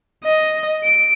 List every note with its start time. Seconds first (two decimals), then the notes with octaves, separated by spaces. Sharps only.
0.24 D#5
0.83 D7